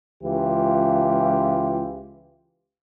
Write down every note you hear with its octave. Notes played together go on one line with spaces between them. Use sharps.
C#2 E3 F4 G4